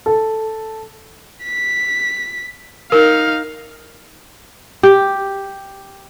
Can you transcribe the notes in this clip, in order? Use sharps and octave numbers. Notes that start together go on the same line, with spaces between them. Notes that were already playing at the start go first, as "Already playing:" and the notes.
A4
B6
D#4 A#4 F5
G4